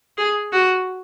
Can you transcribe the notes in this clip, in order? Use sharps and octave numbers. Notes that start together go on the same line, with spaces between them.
G#4
F#4